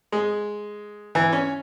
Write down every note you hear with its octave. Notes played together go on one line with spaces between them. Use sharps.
G#3
E3
C#4